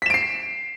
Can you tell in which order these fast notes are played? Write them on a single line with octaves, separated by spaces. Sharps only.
B6 E7 D7 C7